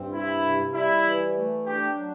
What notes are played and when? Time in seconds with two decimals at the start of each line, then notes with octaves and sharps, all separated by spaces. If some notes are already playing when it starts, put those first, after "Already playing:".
Already playing: G2 C4
0.13 C3 E4
0.44 C3
0.74 G3 E4
1.05 E3
1.36 A3
1.66 D4 G4
1.96 F#3